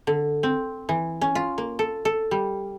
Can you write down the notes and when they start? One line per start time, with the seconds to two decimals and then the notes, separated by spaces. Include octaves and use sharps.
0.07 D3
0.43 C4
0.89 E3
1.21 C#4
1.35 F4
1.58 A#3
1.79 A4
2.05 A4
2.31 G3